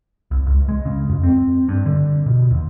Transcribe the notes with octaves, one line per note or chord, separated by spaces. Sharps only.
C2
C#2
G#3
C#3
F2
C4
G2
D3
B2
D#2